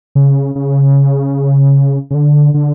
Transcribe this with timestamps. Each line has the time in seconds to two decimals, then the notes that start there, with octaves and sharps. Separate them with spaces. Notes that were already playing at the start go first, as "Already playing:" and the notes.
0.15 C#3
0.55 C#3
2.11 C#3
2.14 D3
2.54 D3